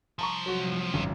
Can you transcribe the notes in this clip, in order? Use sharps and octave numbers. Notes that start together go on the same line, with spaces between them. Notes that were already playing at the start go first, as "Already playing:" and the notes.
C2 F3 A5 A#5 C#6
F#3 F#4
G#1 C#2 F#2